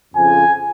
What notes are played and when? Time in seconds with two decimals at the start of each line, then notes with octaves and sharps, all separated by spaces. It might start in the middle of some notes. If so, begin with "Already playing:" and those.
0.14 F2 C#3 F3 G#5